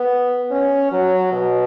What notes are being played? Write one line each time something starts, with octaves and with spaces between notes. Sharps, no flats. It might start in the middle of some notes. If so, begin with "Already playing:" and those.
Already playing: B3
C#4
F#3
B2